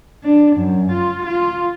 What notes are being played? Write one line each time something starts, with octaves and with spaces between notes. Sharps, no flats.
D4
F#2
F4
F4